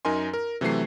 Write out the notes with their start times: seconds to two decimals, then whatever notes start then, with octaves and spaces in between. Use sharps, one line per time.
0.05 F#2 D#4 A#4 G#5 C6
0.34 A#4
0.61 C3 E3 F#3 A3 C7